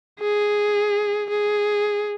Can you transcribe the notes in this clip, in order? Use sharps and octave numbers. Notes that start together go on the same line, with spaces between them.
G#4
G#4